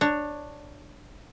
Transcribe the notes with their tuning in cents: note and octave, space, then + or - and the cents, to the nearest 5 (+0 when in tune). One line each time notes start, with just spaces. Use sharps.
D4 +10 C#5 +0